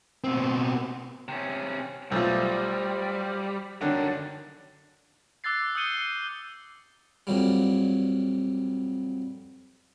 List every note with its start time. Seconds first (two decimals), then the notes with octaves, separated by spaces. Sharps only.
0.24 B2 C4
1.28 C3 C#4
2.12 B1 G3 A3 F4 C5
3.81 F#2 D3 D#3 D4
5.44 D6 E6 F#6 A6 C7
5.75 D#6 E6 G6 C#7 D#7 G7
7.27 F2 A#2 F#3 G3